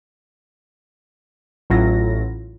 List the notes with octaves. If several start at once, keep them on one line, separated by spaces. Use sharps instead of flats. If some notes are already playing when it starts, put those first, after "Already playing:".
A1 A2 F#3 E4 F4 A#6